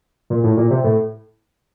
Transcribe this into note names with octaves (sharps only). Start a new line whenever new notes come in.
A#2
A2
A#2
C3
A2